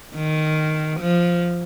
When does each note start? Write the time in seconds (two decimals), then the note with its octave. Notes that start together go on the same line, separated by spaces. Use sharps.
0.15 D#3
1.00 F3